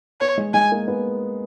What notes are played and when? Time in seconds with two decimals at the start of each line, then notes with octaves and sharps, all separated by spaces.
0.21 B3 C#5
0.38 G#3
0.54 G#3 G#5
0.72 A#3
0.88 B3